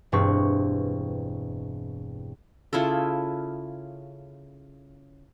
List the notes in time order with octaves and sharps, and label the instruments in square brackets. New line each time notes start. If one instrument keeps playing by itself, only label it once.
[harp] E1 G2 C4 D4 C#6
[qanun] C#3 E4 F4 A4